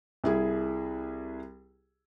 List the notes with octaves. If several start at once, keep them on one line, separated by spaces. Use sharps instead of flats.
C2 E4 G#4